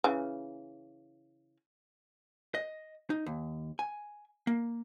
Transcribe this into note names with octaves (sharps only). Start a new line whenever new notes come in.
C#3 E3
D#5
D#4
D#2
G#5
A#3